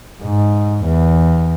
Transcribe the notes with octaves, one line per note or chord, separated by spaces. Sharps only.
G#2
E2